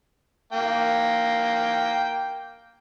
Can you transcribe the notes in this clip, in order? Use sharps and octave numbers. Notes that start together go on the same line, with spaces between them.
A#3 G5